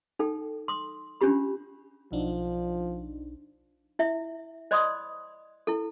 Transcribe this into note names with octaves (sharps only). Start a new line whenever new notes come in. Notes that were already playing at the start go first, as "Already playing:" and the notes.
D#4 A4 G5
C6 D#6
C#4 D4 F4 G4 B5
B1 F3 D4 D#4
E4 E5
C5 D5 D#5 B5 C6 D#6
E4 A4